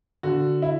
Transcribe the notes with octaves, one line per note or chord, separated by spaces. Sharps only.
D3 F#4
E4